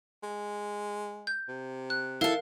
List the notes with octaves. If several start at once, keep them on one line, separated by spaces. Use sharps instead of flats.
G#3
G6
C3
F#6
E4 A4 A#4 F5